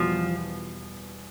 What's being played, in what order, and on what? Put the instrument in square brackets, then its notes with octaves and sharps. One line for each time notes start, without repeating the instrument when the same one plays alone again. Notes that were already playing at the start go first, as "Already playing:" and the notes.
Already playing: [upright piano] E2 B2 G3 [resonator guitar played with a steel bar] F3